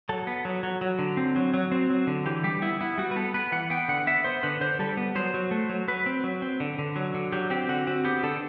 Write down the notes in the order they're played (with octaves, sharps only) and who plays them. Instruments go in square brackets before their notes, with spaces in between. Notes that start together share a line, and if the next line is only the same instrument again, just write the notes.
[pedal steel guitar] F#3 A4
B3
F#3
F#3
F#3
D3
C4
F#3
F#3
C4
F#3
D3
E3 G4
G3 G4
B3 E4
B3 E4
G3 F#4
B4
B3 A4
B3 B4
E3 F#5
B3 G5
D3 F#5
B3 E5
B3 C5
D3 B4
D3 C5
G3 A4
B3
F#3 C5
F#3
A3
F#3
F#3 B4
C4
F#3
C4
D3
D3
F#3
D3
F#3 G4
C4 G4
D3 F#4
C4 F#4
B3 G4
D3 A4